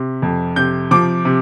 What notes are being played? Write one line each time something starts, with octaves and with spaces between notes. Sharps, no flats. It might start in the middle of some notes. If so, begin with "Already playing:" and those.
Already playing: C3
F2
C3 G6
F3 D6
C3